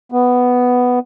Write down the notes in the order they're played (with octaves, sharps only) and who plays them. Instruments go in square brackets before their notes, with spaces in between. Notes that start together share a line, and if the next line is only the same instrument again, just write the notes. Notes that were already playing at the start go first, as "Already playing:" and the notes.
[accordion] B3